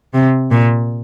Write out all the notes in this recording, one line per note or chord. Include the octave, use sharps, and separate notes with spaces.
C3
A#2